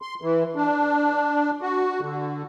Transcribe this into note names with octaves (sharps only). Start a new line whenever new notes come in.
C6
E3
D4
F#4
D3